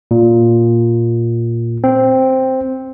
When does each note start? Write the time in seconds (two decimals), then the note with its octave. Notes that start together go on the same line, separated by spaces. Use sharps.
0.11 A#2
1.84 C4